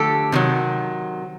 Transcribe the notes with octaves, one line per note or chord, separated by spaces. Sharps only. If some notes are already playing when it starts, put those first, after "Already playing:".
Already playing: D3 F3 A3 G4 A4
C3 D#3 F#3